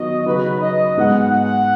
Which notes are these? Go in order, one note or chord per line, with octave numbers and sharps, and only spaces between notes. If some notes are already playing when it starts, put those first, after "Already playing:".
Already playing: D#3 F#3 B3 F#4 D#5
C#3 F#3 D#4 F#4 B4
D#5
G#2 G#3 B3 D#4 F#5
F#5